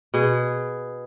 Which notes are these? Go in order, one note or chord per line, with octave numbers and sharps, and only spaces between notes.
B2 G#4